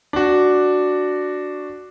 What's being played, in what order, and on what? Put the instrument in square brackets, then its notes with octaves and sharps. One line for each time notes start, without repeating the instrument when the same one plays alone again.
[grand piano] D4 F#4